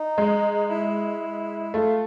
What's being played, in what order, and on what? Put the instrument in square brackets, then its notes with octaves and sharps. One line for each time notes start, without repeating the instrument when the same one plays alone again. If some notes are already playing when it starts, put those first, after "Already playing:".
Already playing: [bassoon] D#4
[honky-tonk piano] G#3
[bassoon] E4
[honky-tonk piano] A3 [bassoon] F4